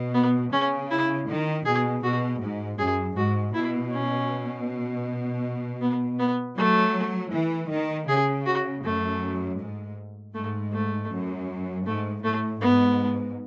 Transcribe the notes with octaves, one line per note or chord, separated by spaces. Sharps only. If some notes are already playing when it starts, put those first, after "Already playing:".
Already playing: B2
B3
C#3 C#4
E4
D#3
B2 G#4
B2 F#4
G#2
F#2 G#4
G#2 F#4
B2 E4
C#4
B3
B3
F#3 A3
E3
D#3
C#3 G#4
F#4
F#2 A3
G#2
G#2 A3
A3
F#2
G#2 A3
A2 A3
G#2 B3